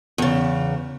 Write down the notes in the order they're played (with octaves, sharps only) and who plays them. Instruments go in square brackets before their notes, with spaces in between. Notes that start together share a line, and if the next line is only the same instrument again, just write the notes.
[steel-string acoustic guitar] E2 C#3